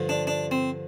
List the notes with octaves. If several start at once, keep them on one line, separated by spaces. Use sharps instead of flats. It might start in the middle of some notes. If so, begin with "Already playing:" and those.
Already playing: G2 D3 F3
D4
D4
C4